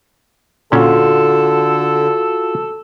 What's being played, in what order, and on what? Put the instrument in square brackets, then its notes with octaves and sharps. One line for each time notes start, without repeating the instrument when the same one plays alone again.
[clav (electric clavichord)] A#2 C#4 [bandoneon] D3 [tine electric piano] F4 F#4 [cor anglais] A4